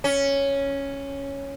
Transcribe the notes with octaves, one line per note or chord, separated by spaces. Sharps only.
C#4